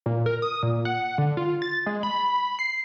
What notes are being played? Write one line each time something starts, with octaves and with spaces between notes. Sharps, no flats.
A#2
A#4
D#6
A#2
F#5
D3
F4
A6
G#3
B5
B5
C7